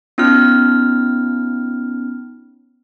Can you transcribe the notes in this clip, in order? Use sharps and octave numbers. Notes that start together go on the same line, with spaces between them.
B3 C#4 D#4 F4 F6